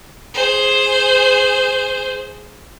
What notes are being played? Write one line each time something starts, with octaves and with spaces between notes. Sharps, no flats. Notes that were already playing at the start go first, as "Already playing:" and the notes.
G#4 C5